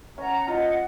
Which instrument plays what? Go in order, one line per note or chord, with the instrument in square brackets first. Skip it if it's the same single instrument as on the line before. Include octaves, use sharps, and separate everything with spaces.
[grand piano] C#4 [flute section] F#5 A#5
[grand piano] F4 [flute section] D#5 F#5